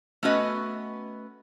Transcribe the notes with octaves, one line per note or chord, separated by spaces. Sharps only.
A3 B3 C#4 F#4 B4 D#5